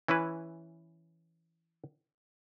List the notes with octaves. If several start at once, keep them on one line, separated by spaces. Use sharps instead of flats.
E3 C#4 E4 B4